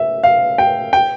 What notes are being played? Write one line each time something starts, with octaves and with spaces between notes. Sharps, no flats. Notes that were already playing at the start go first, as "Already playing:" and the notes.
Already playing: E5
F5
G5
G5